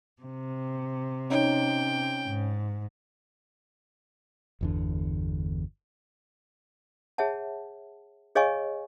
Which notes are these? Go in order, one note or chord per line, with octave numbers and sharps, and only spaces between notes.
C3
C#4 D#4 G5
G#2
G1 E2 D3
G#4 C#5 E5 F#5 A5
G#4 C#5 D#5 F5 G#5 C#6